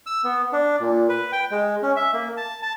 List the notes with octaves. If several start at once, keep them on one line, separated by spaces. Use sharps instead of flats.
E6
B3
D4
A#2
B4
G5
G#3
C#4
E5
A#3
A5
A5